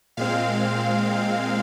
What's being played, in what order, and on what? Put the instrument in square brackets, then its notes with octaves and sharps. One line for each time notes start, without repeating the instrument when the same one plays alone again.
[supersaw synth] A#2 G#3 C4 F5